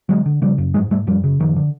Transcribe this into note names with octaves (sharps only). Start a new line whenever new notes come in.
D3 F#3 G#3
D3
C#3 F3 G3
F#2
G#2 F#3 G#3
G#2 G3 A3
F#2 F3 G3
C#3
F#2 D#3 F3
D3